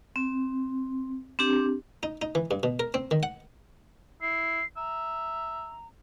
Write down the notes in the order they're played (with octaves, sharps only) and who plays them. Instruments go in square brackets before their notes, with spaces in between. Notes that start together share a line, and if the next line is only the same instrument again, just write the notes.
[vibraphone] C4
C4 D4 G4
[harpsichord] D#4
D#4
E3
G2
B2
A#4
C4
D#3
F#5
[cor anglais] E4 [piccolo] C7
[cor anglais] E5 [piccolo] A#5